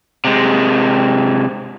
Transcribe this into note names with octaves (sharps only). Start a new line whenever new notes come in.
C3 G#3